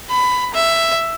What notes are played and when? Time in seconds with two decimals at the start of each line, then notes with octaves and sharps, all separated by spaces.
0.10 B5
0.54 E5